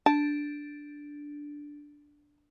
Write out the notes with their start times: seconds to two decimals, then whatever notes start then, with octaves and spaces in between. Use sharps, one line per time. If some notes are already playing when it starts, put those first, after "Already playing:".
0.06 D4 A5